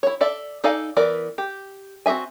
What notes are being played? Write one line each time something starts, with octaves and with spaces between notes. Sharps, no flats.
E4 C#5
A4 D5 E5
D#4 A4 D5 F5 G#5
E3 B3 A#4 D5
G4
C4 F#4 G#4 E5 G#5